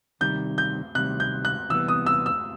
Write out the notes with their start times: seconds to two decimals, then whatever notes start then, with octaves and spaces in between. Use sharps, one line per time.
0.21 C3 D#3 G3 G6
0.58 G6
0.95 C3 D#3 G3 F#6
1.20 G6
1.45 F#6
1.69 C3 E3 G3 B3 E6
1.88 D#6
2.06 E6
2.26 E6